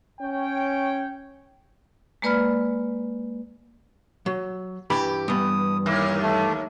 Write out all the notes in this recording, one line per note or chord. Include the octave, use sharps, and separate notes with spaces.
C#4 C#5 G5
G#3 A#3 B4 D5 B5 F6
F#3
G2 E3 G4 B5
G2 E3 B3 D#6
D#2 A#3 E4
A3